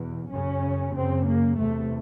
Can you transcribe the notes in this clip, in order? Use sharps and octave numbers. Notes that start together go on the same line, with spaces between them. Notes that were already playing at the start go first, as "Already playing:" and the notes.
Already playing: E2 B2
F#2 C#3 C#4
F#2 C#3 C4
A#3
E2 C3 A3